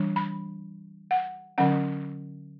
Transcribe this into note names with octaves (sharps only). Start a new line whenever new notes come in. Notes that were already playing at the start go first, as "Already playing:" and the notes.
Already playing: E3 G3 D4
B5
F#5
D3 F#3 C#4 F#5